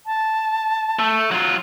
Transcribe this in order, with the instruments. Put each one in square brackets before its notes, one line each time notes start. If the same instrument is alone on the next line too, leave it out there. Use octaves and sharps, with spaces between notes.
[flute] A5
[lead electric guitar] A3
F#3 F4